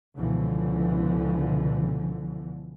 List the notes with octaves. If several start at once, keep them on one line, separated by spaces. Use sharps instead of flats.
C#2 B2 D3 E3 F3